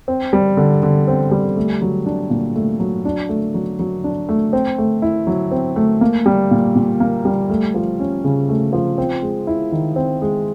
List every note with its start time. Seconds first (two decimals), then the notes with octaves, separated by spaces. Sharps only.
0.08 C4
0.33 G3
0.57 D3
0.83 D3
1.08 C4
1.31 G3
1.57 A3
1.82 F#3
2.06 D4
2.30 A#2
2.55 A3
2.80 F#3
3.05 D4
3.29 A3
3.54 F#3
3.79 F#3
4.04 D4
4.29 A3
4.53 C4
4.78 A3
5.02 E4
5.27 F#3
5.51 C4
5.76 A3
6.01 A#3
6.26 G3
6.51 A#2
6.76 A#2
7.00 A#3
7.25 G3
7.50 A3
7.74 F3
7.99 C#4
8.24 C#3
8.49 A3
8.73 F3
8.98 C4
9.22 G#3
9.47 E4
9.72 D#3
9.96 C4
10.22 G#3